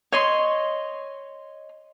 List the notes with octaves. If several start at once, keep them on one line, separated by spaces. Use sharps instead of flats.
C#5 D#5 C6